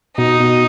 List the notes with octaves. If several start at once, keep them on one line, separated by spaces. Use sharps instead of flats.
B2 D#4
B2